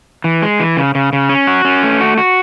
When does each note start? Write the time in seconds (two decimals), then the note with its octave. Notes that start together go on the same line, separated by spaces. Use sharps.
0.24 E3
0.42 G#3
0.60 E3
0.77 C#3
0.95 C#3
1.13 C#3
1.29 C#4
1.47 F#4
1.65 C#4
1.83 A3
2.01 F#4
2.18 F#4